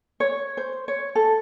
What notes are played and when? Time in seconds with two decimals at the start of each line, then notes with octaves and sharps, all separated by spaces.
0.20 C#5
0.57 C5
0.88 C#5
1.15 A4